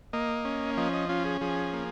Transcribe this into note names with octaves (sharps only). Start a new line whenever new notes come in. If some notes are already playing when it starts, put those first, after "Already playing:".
A#3 D#5
C#4
F3 D#5
D#5
C#4 F4
G#4
F3 G#4
A#3